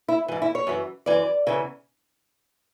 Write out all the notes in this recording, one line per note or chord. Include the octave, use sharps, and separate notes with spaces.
E4
G#2 E3
E4
C#5
F#2 E3
F#2 E3 D5
E2 C#3 E3